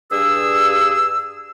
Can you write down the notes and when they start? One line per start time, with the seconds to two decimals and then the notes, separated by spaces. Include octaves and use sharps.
0.11 G2 G#4 E6